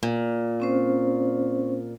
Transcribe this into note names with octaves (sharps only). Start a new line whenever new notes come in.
A#2
C4 C#4 C5